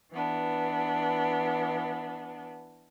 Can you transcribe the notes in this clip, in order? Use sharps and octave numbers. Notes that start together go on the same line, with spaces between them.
E3 B3 D4